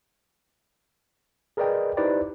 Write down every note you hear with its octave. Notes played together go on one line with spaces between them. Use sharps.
G#4 A#4 B4 D5 D#5 G5
D#4 E4 G4 B4 C5 D5